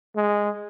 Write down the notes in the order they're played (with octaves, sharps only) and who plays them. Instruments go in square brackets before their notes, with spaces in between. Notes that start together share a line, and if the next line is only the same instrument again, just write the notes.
[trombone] G#3